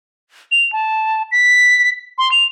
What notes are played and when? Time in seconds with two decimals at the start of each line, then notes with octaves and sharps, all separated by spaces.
0.52 F7
0.73 A5
1.32 B6
2.18 C6
2.32 F7